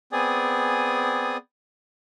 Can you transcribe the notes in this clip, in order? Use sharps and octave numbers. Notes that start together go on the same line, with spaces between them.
B3 C4 G#4 D5 G#5 D#6